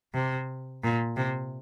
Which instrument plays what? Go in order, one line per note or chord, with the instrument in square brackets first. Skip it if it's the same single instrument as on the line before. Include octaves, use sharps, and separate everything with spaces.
[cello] C3
A#2
C3